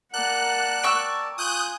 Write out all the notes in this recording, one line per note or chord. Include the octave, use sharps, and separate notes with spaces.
A#3 A#4 D5 F#5 A5 F#6
G5 C#6 E6
F4 G#5 D#6 F#6 G6